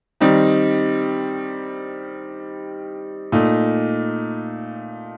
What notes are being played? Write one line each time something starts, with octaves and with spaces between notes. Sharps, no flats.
D#3 G3 C4 D#4
A#2 A3 D#4